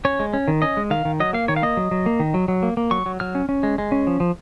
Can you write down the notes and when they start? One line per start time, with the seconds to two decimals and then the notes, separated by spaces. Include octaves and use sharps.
0.05 C#4 C#5
0.20 G#3
0.34 C#4
0.48 D#3
0.62 C#4 D#5
0.77 G#3
0.90 D#3 F5
1.05 D#3
1.20 F#3 D#5
1.33 A#3 F5
1.48 D#3 C#5
1.56 F5
1.63 A#3 D#5
1.77 F#3
1.91 F#3
2.06 A#3
2.20 D#3
2.34 F#3
2.48 F#3
2.63 A#3
2.77 A#3
2.91 F#3 C#6
3.06 F#3
3.20 F#3 F6
3.35 C#4
3.49 C#4
3.63 G#3
3.78 G#3
3.92 C#4
4.07 F3
4.20 F3